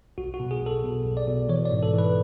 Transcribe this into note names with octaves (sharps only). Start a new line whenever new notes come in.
B1 F#4
F#4
B2
G#4
B1
A4
B2
B1
D5
B2
E3 C#5
D5
G#2
A4
E3
B4